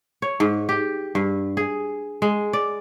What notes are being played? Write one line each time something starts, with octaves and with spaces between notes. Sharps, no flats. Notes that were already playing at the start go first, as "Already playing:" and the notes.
C#5
G#2
G4
G2
G#4
G#3
D5